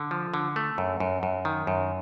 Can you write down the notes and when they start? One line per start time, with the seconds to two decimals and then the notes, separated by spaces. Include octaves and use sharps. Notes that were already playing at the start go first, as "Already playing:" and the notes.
Already playing: D3
0.11 F3
0.34 D3
0.56 A3
0.78 F#2
1.00 F#2
1.23 F#2
1.45 D#3
1.67 F#2